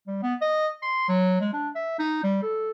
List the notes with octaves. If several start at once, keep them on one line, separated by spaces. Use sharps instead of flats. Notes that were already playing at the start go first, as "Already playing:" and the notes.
G3
B3
D#5
C6
F#3
G#3
D4
E5
D#4
G3
A4